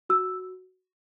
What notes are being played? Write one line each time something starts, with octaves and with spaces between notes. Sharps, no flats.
F#4 E6